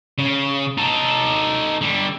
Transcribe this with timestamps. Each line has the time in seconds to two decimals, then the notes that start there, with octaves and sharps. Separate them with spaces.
0.18 C#3
0.78 D#4 A4
1.81 D3 G3